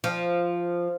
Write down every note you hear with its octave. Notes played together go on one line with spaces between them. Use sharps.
F3